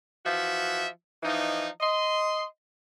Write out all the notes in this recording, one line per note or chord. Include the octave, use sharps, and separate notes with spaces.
E3 F3 F#4 E5
E3 F3 D#4
D#5 C6